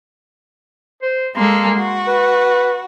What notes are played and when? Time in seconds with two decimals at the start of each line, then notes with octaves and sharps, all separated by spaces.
1.02 C5
1.36 G#3 A#3 A4 C6
1.77 F#4
2.07 B4